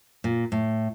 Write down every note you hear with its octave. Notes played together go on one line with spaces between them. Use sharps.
A#2
A2